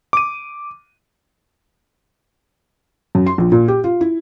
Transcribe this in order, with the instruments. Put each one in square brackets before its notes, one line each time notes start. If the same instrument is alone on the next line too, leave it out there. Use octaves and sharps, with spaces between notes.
[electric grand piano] D6 D#7
[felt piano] F#2
C6
A#1
A#2
G4
F4
E4